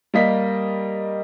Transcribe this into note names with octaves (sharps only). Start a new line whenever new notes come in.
G3 A#3 D#5 B6